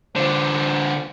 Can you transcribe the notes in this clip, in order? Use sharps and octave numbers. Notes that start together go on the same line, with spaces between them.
D3 F4 C5